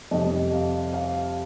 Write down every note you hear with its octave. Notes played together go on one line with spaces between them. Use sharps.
F2 C3 G3 D#5
F5
F5